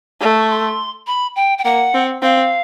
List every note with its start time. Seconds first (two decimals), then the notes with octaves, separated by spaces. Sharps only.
0.21 A3
0.38 C#6
0.50 C6
1.07 B5
1.36 G5
1.58 G5
1.64 A#3 F#5
1.94 C4
2.22 C4 F5